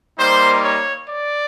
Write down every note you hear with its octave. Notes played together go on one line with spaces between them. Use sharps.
G3 A#3 D#4 C5
C#5
D5